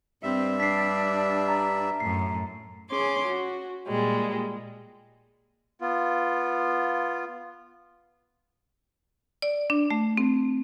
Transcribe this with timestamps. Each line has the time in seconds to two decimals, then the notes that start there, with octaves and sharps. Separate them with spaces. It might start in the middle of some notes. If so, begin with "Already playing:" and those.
0.23 G2 G3 C4 E5
0.60 D4 B6 C7
1.48 A#5 A6
2.00 F#2 A2 C7
2.90 C#4 G#4 C6 D6
3.27 F#4
3.87 A#2 G3 G#3
5.81 B3 F4
9.42 D5
9.70 D4
9.91 A3
10.17 C4